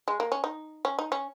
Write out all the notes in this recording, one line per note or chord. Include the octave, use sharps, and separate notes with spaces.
G#3
A#3
C#4
D#4
C#4
D#4
C#4